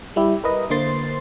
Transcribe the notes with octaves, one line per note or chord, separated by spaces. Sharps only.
G3 E4 G4
A#4 B4 D#5
D3 A#3 C5 C6 A6